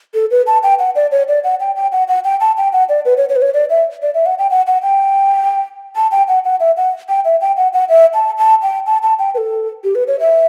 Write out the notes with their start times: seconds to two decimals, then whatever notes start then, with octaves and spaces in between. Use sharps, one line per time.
0.14 A4
0.31 B4
0.47 A5
0.63 G5
0.79 F#5
0.96 D5
1.12 C#5
1.28 D5
1.44 F#5
1.60 G5
1.76 G5
1.92 F#5
2.08 F#5
2.25 G5
2.41 A5
2.57 G5
2.73 F#5
2.89 D5
3.05 B4
3.17 C#5
3.29 C#5
3.36 B4
3.42 C#5
3.54 D5
3.70 E5
4.02 D5
4.14 E5
4.26 F#5
4.39 G5
4.51 F#5
4.67 F#5
4.83 G5
5.96 A5
6.12 G5
6.28 F#5
6.45 F#5
6.60 E5
6.77 F#5
7.09 G5
7.25 E5
7.41 G5
7.57 F#5
7.73 F#5
7.89 E5
8.14 A5
8.38 A5
8.62 G5
8.87 A5
9.03 A5
9.19 G5
9.34 B4
9.38 A4
9.84 G4
9.95 B4
10.08 C#5
10.20 E5